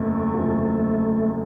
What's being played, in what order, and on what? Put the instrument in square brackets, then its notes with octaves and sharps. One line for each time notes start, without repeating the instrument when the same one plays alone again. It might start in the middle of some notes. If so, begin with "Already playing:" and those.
Already playing: [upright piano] F#1 E2 C3 F3 [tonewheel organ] A3
[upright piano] F#1 E2 C3 F3